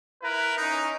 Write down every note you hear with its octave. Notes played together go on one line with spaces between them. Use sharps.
E4 A#4 B4
C#4 D#4